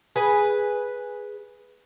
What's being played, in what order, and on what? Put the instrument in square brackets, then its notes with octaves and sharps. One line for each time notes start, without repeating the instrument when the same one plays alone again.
[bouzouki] G#4 B4 G#5